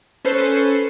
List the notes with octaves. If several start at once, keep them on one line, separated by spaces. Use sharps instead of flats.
C#4 A4 B4 C5 C7 C#7